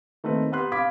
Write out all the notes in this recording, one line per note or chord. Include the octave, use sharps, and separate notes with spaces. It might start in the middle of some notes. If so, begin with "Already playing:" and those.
D#3 A3 C4 B4
B3 G4 B4 C6 F#6
F5 B5 D6 G#6 B6